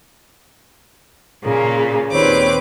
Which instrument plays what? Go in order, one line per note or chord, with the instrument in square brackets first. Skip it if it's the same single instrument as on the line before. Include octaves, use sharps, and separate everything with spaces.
[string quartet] A#2 C#3 A#3
[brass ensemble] D#2 A#2 C#5 [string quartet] C4 B4 D6